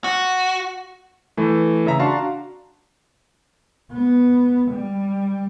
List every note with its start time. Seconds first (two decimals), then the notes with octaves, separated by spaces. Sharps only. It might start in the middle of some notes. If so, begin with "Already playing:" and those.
0.04 F#4
1.37 E3 A3
1.86 C#3 E5 A#5
1.99 D4 F#4 F5 A5 A#5 C6
3.93 B3
4.71 G3